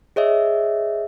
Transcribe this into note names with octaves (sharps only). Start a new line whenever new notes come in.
G#4 C#5 D#5 E5